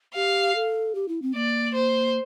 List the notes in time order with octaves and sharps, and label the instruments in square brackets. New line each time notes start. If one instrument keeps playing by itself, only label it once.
[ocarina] G4 [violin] F5
[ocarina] A4
G4
E4
C4
[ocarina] A#3 [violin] D5
[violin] C5